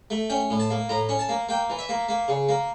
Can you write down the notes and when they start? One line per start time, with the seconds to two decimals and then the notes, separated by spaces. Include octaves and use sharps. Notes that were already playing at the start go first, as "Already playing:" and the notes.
0.10 A3
0.30 C#4 G5
0.50 A2
0.60 A5
0.70 A#3
0.89 A2 A#5
1.09 C#4
1.19 A5
1.29 A#3
1.49 A#3 G5
1.70 E3
1.79 E5
1.89 A#3
2.09 A#3
2.28 C#3
2.49 A#3